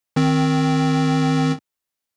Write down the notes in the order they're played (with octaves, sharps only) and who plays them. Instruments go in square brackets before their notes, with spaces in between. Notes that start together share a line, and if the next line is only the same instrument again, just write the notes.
[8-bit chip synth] D#3 C4